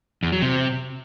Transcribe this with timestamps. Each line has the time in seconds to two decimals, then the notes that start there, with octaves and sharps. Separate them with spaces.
0.23 E2
0.32 F#3
0.42 C3